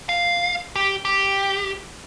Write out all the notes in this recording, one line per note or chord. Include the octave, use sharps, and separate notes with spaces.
F5
G4
G4